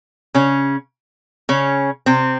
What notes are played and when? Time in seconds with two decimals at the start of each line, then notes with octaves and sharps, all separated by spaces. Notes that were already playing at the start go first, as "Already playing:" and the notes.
0.35 C#3 C#4
1.49 C#3 C#4
2.06 C3 C4